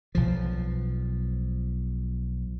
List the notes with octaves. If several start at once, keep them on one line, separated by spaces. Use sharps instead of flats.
B1 F3